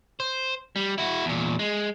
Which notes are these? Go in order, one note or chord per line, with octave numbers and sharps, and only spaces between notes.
C5
G3
E4 F#4
E2 A#2
G#3